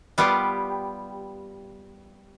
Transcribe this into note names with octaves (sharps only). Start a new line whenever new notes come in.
G3 B3 F4 G4